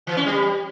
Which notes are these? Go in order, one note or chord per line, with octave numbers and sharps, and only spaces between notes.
E3
C#4
G3